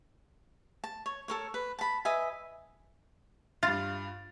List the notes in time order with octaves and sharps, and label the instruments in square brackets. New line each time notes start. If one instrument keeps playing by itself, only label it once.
[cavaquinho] A5
C#5
A4 A#4 C#5
B4
A5 B5
B4 D#5 E5 G#5
[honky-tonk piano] G2 A6 [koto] F4